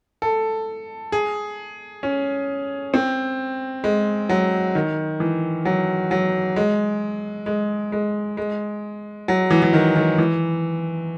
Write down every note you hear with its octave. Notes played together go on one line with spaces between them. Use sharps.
A4
G#4
C#4
C4
G#3
F#3
D#3
E3
F#3
F#3
G#3
G#3
G#3
G#3
F#3
E3
E3
D#3
D#3
E3